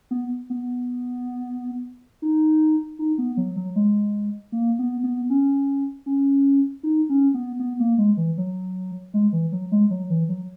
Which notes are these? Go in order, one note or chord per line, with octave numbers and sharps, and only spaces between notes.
B3
B3
D#4
D#4
B3
F#3
F#3
G#3
A#3
B3
B3
C#4
C#4
D#4
C#4
B3
B3
A#3
G#3
E3
F#3
G#3
E3
F#3
G#3
F#3
E3
F#3